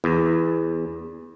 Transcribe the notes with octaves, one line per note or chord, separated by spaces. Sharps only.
E2